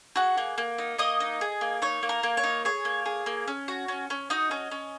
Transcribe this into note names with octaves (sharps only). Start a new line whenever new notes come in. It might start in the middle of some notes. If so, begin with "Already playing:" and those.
F#4 G#4 F#5
A#3
A#3
D#4
A#3 D#5 D#6
D#4
G#4
A#3
D#4 C#5
A#3
A#4
A#3
C#5
D#4
G#4 C#5
A#3
G#4
A#3
C#4
F#4
C#4
C#4
D#4 F#4 D#5
C#4
C#4